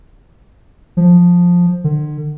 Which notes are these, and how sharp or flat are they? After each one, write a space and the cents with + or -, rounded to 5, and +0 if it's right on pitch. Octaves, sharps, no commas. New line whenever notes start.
F3 +10
D3 +40